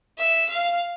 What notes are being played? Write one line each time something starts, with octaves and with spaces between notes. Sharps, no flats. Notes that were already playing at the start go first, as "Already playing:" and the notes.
E5
F5